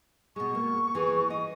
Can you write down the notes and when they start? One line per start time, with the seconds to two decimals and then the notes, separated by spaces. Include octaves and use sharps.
0.36 B2 G#3 C#6
0.55 A#3
0.95 E3 G#4
1.30 D#5